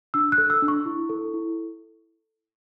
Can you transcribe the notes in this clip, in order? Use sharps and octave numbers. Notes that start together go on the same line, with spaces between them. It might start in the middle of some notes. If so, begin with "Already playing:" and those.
D4 E6
F#6
A4
E6
D4
C#6
E4
A4
E4